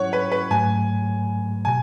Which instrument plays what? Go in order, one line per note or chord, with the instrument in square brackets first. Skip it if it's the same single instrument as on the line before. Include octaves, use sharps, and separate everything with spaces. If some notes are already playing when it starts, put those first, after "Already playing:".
Already playing: [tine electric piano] G#2 F#3 C#4 E4 [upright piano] C#5 F#5
[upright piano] B4
B4
[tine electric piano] G#2 F#3 A3 [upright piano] G#5
[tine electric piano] B2 [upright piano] G#5